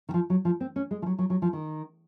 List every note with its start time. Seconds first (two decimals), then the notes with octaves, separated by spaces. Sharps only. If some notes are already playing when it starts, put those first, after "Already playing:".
0.09 D#3
0.14 F3
0.30 F#3
0.45 F3
0.60 C4
0.76 C#4
0.91 G#3
1.02 F3
1.06 F#3
1.19 F#3
1.30 F#3
1.42 F3
1.53 D#3